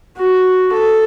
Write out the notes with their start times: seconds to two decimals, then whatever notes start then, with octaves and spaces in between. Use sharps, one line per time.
0.17 F#4
0.72 A4